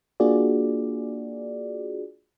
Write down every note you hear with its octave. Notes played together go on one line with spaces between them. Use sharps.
A#3 D4 F4 F#4 G#4 D5